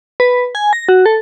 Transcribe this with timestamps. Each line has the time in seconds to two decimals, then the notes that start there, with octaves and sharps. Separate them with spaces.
0.20 B4
0.55 G#5
0.73 A#6
0.89 F#4
1.06 A4